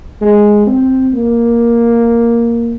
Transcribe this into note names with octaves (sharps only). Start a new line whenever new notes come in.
G#3
C4
A#3